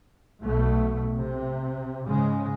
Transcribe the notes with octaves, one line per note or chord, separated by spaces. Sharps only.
B1 B2 A3
C3
G#2 C#3 G#3